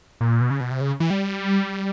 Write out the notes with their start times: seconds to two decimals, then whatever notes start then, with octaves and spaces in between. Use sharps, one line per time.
0.21 A#2
0.41 B2
0.51 C#3
0.61 B2
0.71 C3
0.81 C#3
1.00 E3
1.10 G3